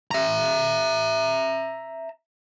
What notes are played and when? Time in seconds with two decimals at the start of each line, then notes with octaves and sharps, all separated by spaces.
0.11 E5 A#5